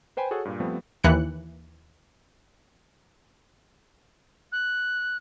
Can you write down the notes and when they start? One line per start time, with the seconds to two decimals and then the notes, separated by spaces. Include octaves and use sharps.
0.17 B4 C5 G5 G#5 B5
0.31 F#4 G#4 A4 C#5 F#5
0.45 G2 A#2
0.60 F3 G3 A3 B3 C4
1.04 D#2 E3 F#6 C#7
4.52 F#6